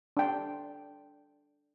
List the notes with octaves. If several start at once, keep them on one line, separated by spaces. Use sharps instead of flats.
D4 G5